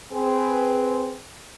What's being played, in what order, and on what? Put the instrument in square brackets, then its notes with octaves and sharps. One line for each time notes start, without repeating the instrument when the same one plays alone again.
[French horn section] C4 G#4 B4